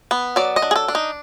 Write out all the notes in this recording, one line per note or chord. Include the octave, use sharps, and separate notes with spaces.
B3
F#3 D5
D#5
D4
G#4
A4
D4
D#4